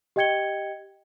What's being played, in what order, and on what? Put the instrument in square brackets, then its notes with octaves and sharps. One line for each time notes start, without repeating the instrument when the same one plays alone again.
[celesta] G4 D#5 G5 G#6 C#7 G7